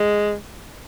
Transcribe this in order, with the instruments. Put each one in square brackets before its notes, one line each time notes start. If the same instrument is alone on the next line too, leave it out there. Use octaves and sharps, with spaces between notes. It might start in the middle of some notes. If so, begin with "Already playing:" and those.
Already playing: [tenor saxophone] G#3